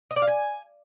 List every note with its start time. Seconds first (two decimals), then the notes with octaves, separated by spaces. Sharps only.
0.11 D#5
0.16 D5
0.22 F5
0.27 G#5